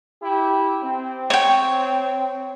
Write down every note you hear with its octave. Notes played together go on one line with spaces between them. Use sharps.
E4 G4
C4
C#5 G5